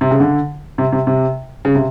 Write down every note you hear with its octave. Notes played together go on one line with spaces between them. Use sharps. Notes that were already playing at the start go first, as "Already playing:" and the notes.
C3
C#3
D3
C3
C3
C3
C#3
C3